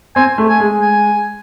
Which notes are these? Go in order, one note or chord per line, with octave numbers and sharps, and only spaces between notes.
C4 G#5
A3
G#5
G#3
G#5